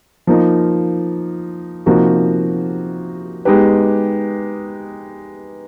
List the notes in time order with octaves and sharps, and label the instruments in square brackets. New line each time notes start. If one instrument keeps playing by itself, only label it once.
[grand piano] F3 A#3 D#4
C3 F3 A#3 D#4 F#4
G#3 B3 D#4 G4 B4